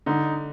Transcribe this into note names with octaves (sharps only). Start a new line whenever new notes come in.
D3 D#4